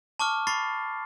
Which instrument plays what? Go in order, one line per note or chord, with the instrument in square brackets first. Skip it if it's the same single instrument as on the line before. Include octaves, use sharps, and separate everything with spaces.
[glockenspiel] A5 C#6 D6 F6
B5 C#6 A6 C7